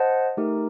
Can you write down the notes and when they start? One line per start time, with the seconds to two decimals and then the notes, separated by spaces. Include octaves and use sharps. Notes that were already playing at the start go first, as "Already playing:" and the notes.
Already playing: C5 D#5 F#5 A5
0.37 A3 D#4 G4 A#4